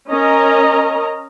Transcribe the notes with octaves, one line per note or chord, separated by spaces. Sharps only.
C#4 A#4 D#5 A#5